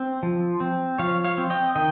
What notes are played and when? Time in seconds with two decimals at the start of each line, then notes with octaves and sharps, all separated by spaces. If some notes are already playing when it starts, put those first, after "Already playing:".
Already playing: C4
0.23 F3
0.60 C4
0.98 F3 C#5 F5
1.24 C#5 F5
1.38 C4
1.50 D#5 G5
1.76 D#3 D#5 G5